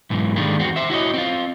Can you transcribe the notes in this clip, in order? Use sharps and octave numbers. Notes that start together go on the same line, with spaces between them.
B1 G#2 E3
D3 D#3 G3 G#3 A#3
E2 C4 F#4
C5 E5
E4 F#4 C#5 D#5
C4 F4